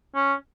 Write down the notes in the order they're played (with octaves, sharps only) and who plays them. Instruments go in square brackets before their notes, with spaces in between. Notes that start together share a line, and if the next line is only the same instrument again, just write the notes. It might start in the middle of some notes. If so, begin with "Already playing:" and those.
[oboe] C#4